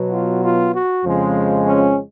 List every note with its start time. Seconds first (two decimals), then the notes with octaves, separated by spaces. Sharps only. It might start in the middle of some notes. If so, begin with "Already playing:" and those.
Already playing: B2 F#3 B3
0.11 F4
0.43 F4
0.73 F#4
1.03 F2 C#3 F3 G#3
1.65 C#4